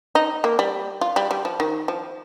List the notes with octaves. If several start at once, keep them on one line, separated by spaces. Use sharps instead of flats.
D#4
A#3
G3
F4
G3
G3
F3
D#3
F3